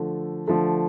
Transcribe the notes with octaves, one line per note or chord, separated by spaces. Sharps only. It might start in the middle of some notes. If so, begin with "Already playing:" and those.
Already playing: D3 F3 A3
D3 F3 A3